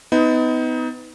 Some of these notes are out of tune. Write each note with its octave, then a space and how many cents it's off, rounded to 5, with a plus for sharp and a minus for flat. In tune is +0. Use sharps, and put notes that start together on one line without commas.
B3 +30 D#4 +25